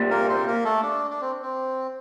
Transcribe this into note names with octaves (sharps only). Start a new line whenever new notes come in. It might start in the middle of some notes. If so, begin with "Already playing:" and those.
Already playing: C2 A#2 G3
A#3 A#4
C4 C5
A#3 A#4
A3 A4
D4
D4
C4
C4